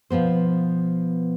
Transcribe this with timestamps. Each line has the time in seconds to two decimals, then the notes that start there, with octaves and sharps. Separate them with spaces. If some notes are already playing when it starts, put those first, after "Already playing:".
0.10 B2 F3 B3 C5